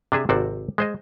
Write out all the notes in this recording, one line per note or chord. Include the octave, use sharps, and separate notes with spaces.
C3 D4 G#4 E5
G#1 C3 F#4 C5 D5
G#3 C5 D#5